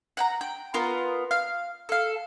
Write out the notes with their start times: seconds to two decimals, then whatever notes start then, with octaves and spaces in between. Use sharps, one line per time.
0.17 F#5 G5 A#5
0.41 G5
0.74 B3 F4 A#4
1.31 F5
1.89 A4 F5